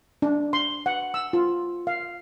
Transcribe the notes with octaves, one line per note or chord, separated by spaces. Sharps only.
D4
C6
F#5
E6
F4
F5